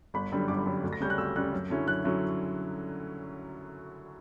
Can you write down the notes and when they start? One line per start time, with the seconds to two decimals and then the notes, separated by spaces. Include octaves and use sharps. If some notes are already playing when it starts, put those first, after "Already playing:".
0.14 G1 B5
0.32 F#2 D3 G3
0.48 G1 D6
0.66 F#2 D3 G3
0.84 D2
0.93 A#6
1.00 C#3 G3 C#4 G6
1.10 F#6
1.18 D2 E6
1.36 C#3 G3 C#4 F#6
1.53 F#2
1.70 D3 F#3 C#4 E4
1.88 F#2 F#6
2.04 D3 F#3 C#4 E4